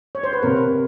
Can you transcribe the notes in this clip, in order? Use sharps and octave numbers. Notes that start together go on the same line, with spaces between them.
C#5
C5
B4
C3 A#4